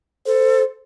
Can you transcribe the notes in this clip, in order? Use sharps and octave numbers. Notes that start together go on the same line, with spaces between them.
A4 C5